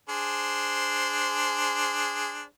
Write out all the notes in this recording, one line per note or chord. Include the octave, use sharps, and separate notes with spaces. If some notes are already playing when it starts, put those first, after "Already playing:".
D4 G#4 C5